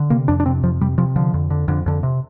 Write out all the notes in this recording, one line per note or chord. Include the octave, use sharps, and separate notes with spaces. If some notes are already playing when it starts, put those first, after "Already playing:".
Already playing: D3
C3 A#3
F2 D4
D4
C3 C4
F2 F3
C3 G3
C3 F3
D3 F3
F2
D3
F2 D3
F2 D3
C3